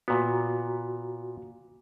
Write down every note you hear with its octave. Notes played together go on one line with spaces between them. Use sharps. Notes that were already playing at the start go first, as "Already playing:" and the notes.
A#2 B3 F#4